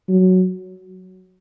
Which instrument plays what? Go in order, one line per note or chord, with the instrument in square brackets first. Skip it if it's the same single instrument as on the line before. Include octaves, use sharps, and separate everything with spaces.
[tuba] F#3